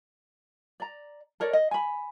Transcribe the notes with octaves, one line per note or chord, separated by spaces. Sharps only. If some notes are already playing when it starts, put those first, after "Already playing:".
D5 A#5
A4 A#4 C#5 D5
D#5
G#5 B5